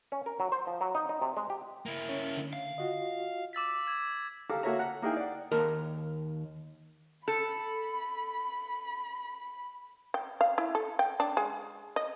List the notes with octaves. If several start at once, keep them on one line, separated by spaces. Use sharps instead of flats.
C#4
A#4
F#3
C5
F3
F#3
D#4
D#4
C3
G#3
G4
A#3 E4
C#4 C#5
D3
F5
F4 F#4 D#5
D6 E6 A6 B6
E6 G#6
G4 A4 F5 A#5 D6
A#3 F#4 A4 C#5 E5 A#5
F#5 A#5
A#3 D#4 E4 G#4 A#4 G5
D5 F#5
D#2 A#4 A5
A4 B5
G5
F5
E4
A4
G5
D4
G#3
D#5